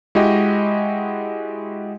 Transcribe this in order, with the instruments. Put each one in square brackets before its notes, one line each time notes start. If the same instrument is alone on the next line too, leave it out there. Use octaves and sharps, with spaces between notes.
[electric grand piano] G#3 E4 F#4 G4 D#5